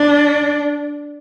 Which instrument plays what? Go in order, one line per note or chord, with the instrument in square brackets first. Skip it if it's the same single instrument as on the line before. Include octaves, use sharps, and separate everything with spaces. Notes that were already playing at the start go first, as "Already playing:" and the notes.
Already playing: [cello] D4